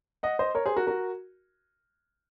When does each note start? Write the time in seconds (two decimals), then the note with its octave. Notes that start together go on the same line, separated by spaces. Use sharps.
0.23 D#5 F#5
0.39 C5 D#5
0.55 A#4 C#5
0.66 G#4 C5
0.76 F#4 A#4
0.87 F#4 A#4